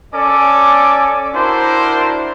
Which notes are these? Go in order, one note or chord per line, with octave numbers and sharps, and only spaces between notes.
C#4 A4 D5 G#5 D6
D4 E4 F#4 A#4 C5